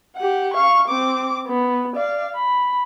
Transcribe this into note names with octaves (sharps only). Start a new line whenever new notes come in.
G4 F#5
F5 C#6
C4 D6
B3
D5 F5
B5